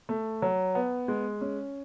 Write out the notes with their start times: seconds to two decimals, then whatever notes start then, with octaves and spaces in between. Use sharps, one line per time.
0.09 A3
0.42 F#3
0.75 B3
1.08 G#3
1.41 C#4